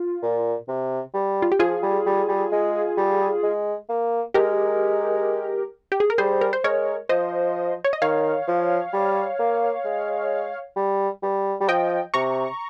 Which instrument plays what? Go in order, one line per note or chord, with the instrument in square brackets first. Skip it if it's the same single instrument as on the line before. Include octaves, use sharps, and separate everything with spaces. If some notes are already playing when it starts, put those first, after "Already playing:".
Already playing: [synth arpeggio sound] F4
[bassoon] A#2
C3
G3
[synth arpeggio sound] F4
G4
[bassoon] F3 [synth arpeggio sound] F4 G#4
[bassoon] G3
G3
G3
G#3
G3
G#3
A#3
[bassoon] G#3 [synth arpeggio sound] G4 A#4
[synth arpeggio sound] G4
G#4
A#4
[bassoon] G3 [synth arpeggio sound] G#4 C5
[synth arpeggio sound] A#4
C5
[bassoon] G#3 [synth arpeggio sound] A#4 C#5
[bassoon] F3 [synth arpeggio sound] C5 D#5
[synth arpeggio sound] C#5
D#5
[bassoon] D#3 [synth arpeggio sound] C#5 F5
[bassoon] F3
G3
A#3
G#3
G3
G3
G3
[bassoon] F3 [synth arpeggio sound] D#5 G5
[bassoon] C3 [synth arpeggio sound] A#5 C#6